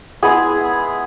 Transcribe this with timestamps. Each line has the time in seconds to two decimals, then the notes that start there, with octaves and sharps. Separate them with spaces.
0.23 G#3 B3 E4 G#4